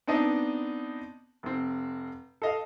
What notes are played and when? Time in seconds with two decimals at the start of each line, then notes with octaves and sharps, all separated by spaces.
0.07 B3 C4 D4 D#4 D#5 A5
1.43 F1 C4
2.42 A4 D#5 F5